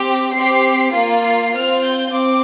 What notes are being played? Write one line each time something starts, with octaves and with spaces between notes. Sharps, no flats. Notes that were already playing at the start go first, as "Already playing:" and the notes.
Already playing: C4 G4
C4 G4 C7
A#3 F4
C7
C4 F4 F6
G6
C4 D6